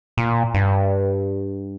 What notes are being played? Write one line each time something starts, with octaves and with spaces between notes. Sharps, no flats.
A#2
G2